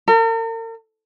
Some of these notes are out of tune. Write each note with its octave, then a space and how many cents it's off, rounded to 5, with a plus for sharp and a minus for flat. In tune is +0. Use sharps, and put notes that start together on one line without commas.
A#4 -45